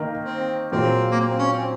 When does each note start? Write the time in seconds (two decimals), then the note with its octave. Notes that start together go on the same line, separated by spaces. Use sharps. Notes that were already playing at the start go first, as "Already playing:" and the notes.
Already playing: D#3 A#3 D#4 A#4
0.25 C4
0.72 A#2 F#3 A#3 C4 F4 G#4
1.11 A#3
1.20 C4
1.39 C#4
1.53 C4